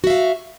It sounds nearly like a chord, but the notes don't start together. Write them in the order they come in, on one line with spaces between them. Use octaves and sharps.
F#4 E5 F5